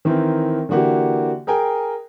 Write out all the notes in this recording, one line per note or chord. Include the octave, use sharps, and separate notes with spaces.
D#3 E3 C4 A#4
D3 E3 A#3 F#4 G4
G#4 A#4 G5 G#5